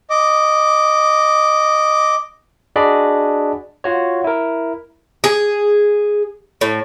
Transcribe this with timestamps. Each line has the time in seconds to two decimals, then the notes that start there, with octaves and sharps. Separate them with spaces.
0.10 D#5 D6
2.76 D4 F#4 G#4 D5 D#5 B5
3.84 F4 F#4 C#5
4.24 E4 A#4
5.24 G#4
6.61 A2